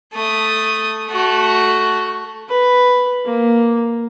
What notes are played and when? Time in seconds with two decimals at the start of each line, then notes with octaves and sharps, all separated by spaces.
0.14 A3 D#6
1.08 A3 F#4
2.48 B4
3.24 A#3